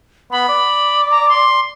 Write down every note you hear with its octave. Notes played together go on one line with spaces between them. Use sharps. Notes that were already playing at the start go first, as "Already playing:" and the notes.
B3 B5
D5
A#5
C6